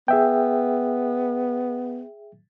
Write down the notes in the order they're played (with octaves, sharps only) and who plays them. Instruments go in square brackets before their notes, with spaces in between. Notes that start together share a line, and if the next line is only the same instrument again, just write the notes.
[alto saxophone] B3 [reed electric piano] G#4 E5 G5